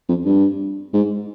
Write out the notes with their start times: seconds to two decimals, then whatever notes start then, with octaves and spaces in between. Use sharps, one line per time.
0.09 F2
0.25 G2
0.94 G#2